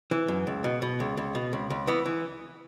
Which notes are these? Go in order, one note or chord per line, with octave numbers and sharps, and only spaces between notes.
E3
F#2
C#2
B2
B2
C#2
C#2
B2
C#2
C#2
E3 B3
E3